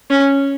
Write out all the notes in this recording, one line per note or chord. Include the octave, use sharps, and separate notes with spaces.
C#4